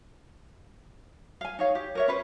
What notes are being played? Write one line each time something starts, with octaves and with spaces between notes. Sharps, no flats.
F5 G#5
D#4 C#5 F5
G4
A#4 C#5 E5
C#4 B4 C5